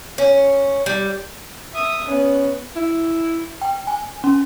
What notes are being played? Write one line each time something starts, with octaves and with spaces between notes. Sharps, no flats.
C#4
G3
E5 D#6
B3 C#4
E4
G5
G#5
C#4